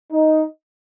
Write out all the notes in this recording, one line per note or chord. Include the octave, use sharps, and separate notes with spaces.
D#4